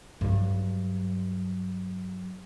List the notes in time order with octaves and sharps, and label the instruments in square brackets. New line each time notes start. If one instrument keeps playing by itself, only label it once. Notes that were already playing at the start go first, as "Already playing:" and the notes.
[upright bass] G2 F#3